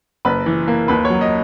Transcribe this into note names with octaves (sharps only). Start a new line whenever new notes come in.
F#1 B4
E3
A#3
D#2 B4
C#5
F#3
D#5